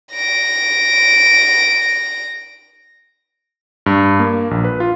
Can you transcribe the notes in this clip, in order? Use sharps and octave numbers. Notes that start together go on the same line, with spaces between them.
A#6 D7
G2
A#3
A#1
B4
F4